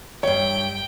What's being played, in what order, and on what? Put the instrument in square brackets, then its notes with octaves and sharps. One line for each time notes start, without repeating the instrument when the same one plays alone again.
[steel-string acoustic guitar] G2 E5 [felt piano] C#5 [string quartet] G5